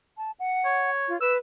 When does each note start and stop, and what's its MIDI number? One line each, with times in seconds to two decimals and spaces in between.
0.18 0.31 81
0.40 0.90 78
0.65 1.15 73
1.08 1.19 65
1.21 1.38 71
1.21 1.34 88